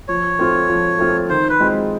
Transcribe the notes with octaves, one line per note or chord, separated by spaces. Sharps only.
F3 C#5
A3 C4 F4
F3
A3 C4 F4
D#3 C5
B4
G#3 C4 F4 G#4